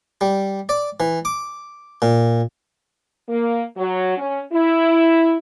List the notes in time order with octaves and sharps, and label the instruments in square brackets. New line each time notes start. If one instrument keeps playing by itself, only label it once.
[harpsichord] G3
D5
E3
D6
A#2
[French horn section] A#3
F#3
C#4
E4